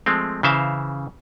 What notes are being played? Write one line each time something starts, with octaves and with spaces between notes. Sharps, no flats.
F3 G#3 A3 C4
C#3 E3 C5 E5 F5 A#5